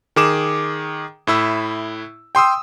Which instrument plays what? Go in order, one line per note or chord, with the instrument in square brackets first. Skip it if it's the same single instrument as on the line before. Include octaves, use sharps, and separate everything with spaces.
[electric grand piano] D#3 G#4 D6 E7
A2 E4 E6
G5 C6 D#6 E6